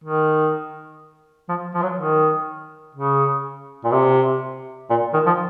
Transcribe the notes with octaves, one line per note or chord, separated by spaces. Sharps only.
D#3
F3
F3
F#3
D#3
C#3
A#2
C3
A#2
D#3
F3